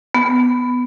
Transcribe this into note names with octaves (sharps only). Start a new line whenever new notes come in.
B3